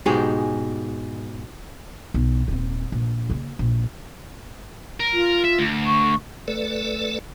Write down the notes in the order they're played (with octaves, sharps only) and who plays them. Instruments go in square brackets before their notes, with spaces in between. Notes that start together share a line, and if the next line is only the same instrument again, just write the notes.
[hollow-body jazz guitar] G#2 B2 G#3 D#4 G4 G#4
[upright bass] B1
D#1 C4
A#1
C#3 A#3
A#1
[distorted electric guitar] A#4
[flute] F4
[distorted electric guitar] E5
D2
[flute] C#6
[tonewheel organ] A3 A4 B4 D5